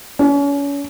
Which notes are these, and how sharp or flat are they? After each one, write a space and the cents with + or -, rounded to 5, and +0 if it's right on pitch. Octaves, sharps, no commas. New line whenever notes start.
C#4 +35